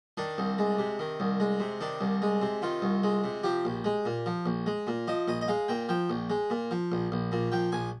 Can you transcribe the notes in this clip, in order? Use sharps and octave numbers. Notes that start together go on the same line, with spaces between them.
D#3 D4
C2
G#3
C3
D#3
C2
G#3
C3
D#3 D4
C2
G#3
C3
D#3 F4
C2
G#3
C3
F3 G4
A#1
G#3
A#2
F3
A#1
G#3
A#2
F3 D#5
A#1 D#5
D#5
G#3 F5
A#2 G5
F3 G5
A#1
G#3
A#2
F3
A#1
A#1
A#2
F3 G5
A#1 G#5